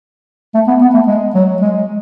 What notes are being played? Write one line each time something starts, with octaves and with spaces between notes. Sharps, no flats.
A3
B3
B3
A3
G#3
F#3
G#3